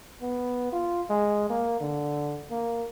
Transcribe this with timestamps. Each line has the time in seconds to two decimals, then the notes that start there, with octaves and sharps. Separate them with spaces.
0.21 B3
0.72 F4
1.10 G#3
1.50 A#3
1.80 D3
2.50 A#3